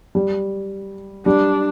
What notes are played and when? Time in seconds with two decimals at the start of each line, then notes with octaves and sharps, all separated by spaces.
0.15 G3
1.26 G3 D4